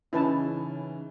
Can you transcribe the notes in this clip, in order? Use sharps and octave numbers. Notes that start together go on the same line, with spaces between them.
C#3 E3 C#4 D#4 E4 B4 A5